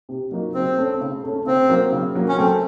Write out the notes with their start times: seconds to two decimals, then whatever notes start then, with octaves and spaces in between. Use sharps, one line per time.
0.09 C3
0.31 F#3 A#3 D#4 F#4
0.55 C#3 C4
0.78 A3 C#4
1.01 C#3
1.24 A3 C#4
1.46 C#3 C4
1.69 F#3 A#3
1.92 C#3
2.15 F#3 A#3
2.28 C#4
2.37 A3 C4